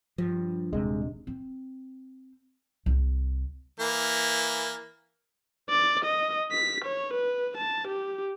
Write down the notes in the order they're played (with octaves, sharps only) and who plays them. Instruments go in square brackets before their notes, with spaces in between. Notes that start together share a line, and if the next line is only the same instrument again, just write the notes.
[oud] G2 [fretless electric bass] F3
[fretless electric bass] D#1 C3 [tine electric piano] G#3
[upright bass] C4
C2
[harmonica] E3 A#3
[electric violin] D5
D#5
B6
C#5
B4
A5
G4